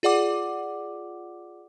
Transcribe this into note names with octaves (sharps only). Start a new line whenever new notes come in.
F4 G#4 D5 F#5 D6